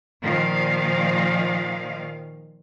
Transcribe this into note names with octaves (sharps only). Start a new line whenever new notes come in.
A#2 D#3 F3 F5